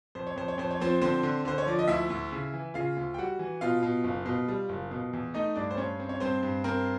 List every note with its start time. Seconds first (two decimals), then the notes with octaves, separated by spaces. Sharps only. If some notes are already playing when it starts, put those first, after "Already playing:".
0.15 F2 C5
0.27 C#5
0.36 F2 C5
0.48 C#5
0.58 F2 C5
0.71 C#5
0.80 F3 C4 C5
1.01 D3 C4 C5
1.23 D3
1.45 D3 C5
1.58 C#5
1.66 F3 D5
1.79 D#5
1.88 D2 E4 E5
2.10 D2
2.32 C#3
2.53 E3
2.74 C#3 F4 F5
2.96 D2
3.14 G5
3.18 G3 F#4 F#5
3.39 E3
3.61 B2 F4 F5
3.83 B2
4.04 F#1
4.26 B2
4.48 G3
4.69 F#1
4.91 B2
5.13 E2
5.34 A3 D#4 D#5
5.55 G2 D4 D5
5.71 C5
5.77 G2 C#4 C#5
6.00 C4
6.09 C#5
6.20 G2 C4 C5
6.43 G2
6.64 C4 A#4